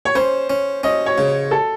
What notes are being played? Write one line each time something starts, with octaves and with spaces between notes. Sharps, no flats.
C#5
C#4 C5
C#4
C#4 D#5
C#5
C#3
A4